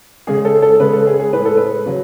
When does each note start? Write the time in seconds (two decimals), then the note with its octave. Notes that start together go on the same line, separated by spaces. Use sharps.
0.27 C#3 G#3 G#4
0.45 A4
0.62 A4
0.80 C#3 G#3 B4
0.93 A4
1.07 G#4
1.20 G#4
1.33 A2 G#3 B4
1.45 A4
1.57 B4
1.86 C#3 F#3